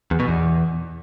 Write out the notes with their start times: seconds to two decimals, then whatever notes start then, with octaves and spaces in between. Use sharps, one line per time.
0.11 E2
0.20 B2
0.28 E2